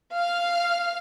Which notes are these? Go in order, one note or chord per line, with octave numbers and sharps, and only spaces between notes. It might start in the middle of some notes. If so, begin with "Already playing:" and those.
F5 F6